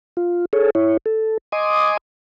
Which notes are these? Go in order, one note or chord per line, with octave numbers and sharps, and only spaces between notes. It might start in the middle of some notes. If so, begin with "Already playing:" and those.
F4
G#4 A4 C#5
E4 C#5
A4
D#5 G#5 C6 D6 D#6